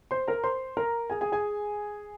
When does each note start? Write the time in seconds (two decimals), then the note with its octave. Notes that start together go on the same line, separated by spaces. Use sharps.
0.11 C5 C6
0.28 A#4 A#5
0.44 C5 C6
0.77 A#4 A#5
1.10 G#4 G#5
1.21 G#4 G#5
1.32 G#4 G#5